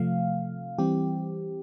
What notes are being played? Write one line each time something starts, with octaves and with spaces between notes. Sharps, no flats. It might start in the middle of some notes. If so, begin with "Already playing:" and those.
Already playing: C3 F3 A3 F5
E3 G3 C4 G4